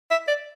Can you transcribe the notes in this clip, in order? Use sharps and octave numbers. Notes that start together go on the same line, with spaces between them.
E5
D5